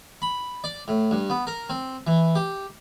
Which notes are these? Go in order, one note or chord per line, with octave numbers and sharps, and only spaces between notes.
B5
D5
A2
G2
B3
A#4
C4
E3
G4